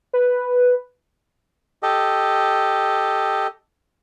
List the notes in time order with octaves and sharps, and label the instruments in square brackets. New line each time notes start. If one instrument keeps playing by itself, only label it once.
[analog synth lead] B4
[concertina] G4 A4 D#5